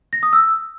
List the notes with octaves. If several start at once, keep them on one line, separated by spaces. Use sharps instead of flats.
A#6
D#6
E6